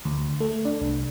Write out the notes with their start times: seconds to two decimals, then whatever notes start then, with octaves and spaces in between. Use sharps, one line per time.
0.05 D2
0.40 A3
0.65 D4
0.81 C2